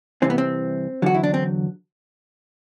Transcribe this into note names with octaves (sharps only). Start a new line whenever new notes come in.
C2 C3 E3 C4
B3
C4
E2 D3 F#3 F#4
E4
D4
C4